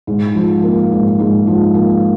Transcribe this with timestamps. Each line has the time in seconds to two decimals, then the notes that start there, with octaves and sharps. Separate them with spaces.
0.07 G#2
0.35 F3
0.63 A#3
0.92 G#2
1.20 G#2
1.47 F3
1.75 A#3